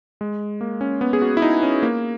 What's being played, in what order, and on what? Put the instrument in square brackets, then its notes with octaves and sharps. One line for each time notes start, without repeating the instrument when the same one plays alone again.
[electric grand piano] G#3
A#3
C#4
B3
G#4
F#4
E4
D#4
C#4
A#3